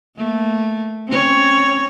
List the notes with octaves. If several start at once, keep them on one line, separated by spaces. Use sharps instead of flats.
A3 A#3
C4 C#4 C#5